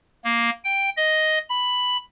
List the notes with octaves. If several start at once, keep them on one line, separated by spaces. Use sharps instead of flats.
A#3
G5
D#5
B5